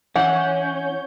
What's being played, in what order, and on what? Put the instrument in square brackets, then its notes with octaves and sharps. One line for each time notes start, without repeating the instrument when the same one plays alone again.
[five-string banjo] E3 [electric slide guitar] C#4 [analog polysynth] C#5 G6 [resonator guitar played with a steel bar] F#5